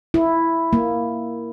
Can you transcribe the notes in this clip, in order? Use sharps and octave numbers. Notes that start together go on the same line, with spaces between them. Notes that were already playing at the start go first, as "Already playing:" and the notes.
E4
A#3